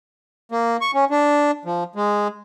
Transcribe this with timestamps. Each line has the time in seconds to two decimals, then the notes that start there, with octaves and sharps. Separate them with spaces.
0.52 A#3
0.81 C#6
0.94 C#4
1.11 D4
1.65 F3
1.95 G#3